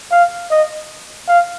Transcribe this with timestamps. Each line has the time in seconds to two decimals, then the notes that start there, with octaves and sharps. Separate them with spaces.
0.12 F5
0.50 D#5
1.28 F5